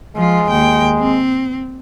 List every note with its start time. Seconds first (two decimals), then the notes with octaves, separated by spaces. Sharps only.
0.16 F3 G#3 F4
0.50 D#2 G5
0.99 C4